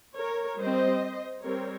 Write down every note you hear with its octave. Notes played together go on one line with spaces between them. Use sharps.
A#4 C#5
G3 C4 C5 D#5
G3 C4 A#4 C#5